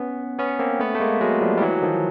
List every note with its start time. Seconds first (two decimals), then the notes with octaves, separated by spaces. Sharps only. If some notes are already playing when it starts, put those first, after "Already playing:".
Already playing: B3 C#4
0.39 B3 C#4
0.59 A#3 C4
0.80 A3 B3
0.95 A3
1.00 G#3 A#3
1.21 F#3 G#3
1.41 F3 G3
1.58 G3
1.62 E3 F#3
1.82 D#3 F3